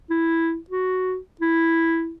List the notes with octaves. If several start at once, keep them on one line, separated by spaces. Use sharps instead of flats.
E4
F#4
E4